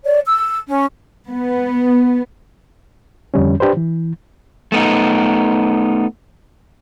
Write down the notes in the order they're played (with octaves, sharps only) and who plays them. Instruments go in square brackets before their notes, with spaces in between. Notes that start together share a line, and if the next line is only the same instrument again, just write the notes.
[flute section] C#5 D5
E6
C#4
[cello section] B3
[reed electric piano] F2 D3 G3 C#4
D4 G4 B4 C5
E3
[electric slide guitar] A3 B3 D#4